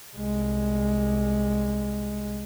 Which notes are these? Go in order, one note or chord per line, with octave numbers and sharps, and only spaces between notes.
C2 G#3